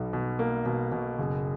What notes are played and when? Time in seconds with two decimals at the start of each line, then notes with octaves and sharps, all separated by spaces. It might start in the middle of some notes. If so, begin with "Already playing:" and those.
Already playing: B1 B2
0.13 B2
0.39 A#3
0.66 B2
0.92 B2
1.18 F#1